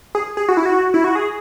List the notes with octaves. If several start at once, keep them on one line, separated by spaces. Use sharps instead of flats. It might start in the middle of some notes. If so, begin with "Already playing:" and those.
G#4
G#4
F#4
E4
F#4
E4
F#4
G#4